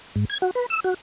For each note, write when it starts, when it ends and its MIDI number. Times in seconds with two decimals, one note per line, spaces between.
0.16 0.25 44
0.30 0.38 92
0.42 0.51 66
0.55 0.66 71
0.70 0.80 88
0.84 0.94 66